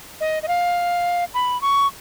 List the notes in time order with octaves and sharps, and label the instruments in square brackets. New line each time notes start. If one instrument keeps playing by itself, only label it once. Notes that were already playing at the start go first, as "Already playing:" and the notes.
[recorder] D#5
D#5
F5
B5
C#6